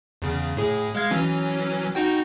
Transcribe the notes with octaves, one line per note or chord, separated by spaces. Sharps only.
E2 C#3
A2 G#4
G#3 F5 G#6
E3 F#3 C#4
D#4 F#4 G5